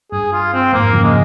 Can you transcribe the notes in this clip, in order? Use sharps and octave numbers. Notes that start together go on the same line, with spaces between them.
G2 G#4
F4
C4
F2 G#2 A#3
C#3 F3
G#3